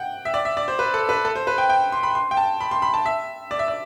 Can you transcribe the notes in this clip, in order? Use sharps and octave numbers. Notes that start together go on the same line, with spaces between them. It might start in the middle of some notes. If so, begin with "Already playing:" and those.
Already playing: F#5 G5
E5
D5
E5
D5
C5
B4
A4
B4
A4
C5
B4
G5
G5
C6
B5
C6
G5
A5
B5
C6
B5
A5
E5
D5
E5
D5